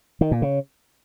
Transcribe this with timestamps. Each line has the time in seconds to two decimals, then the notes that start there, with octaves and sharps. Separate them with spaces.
0.21 D#3
0.31 A#2
0.42 C#3